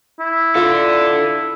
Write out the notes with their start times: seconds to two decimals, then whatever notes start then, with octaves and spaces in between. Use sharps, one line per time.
0.19 E4
0.55 F4 A4 D5